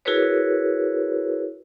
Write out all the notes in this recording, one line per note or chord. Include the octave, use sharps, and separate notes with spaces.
E4 F#4 G#4 A#4 B4 C#5